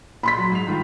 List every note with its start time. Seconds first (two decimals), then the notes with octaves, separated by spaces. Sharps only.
0.23 A#2 B5 C6 B6
0.38 F#3
0.52 G#2 C7 F7
0.67 G2 D#3 F4